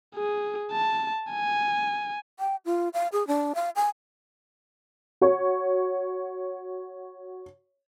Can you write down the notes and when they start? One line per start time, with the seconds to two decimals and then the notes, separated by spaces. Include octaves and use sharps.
0.15 G#4
0.72 A5
1.31 G#5
2.39 G5
2.65 F4
2.94 F5
3.12 G#4
3.27 D4
3.55 F5
3.76 G#5
5.21 F#4 C#5